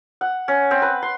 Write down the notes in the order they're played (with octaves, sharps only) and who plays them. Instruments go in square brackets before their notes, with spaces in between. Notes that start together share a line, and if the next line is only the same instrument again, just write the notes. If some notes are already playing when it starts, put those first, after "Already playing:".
[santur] F#5
C#4
C4
B4
C6